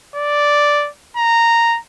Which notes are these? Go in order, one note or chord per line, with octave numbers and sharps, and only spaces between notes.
D5
A#5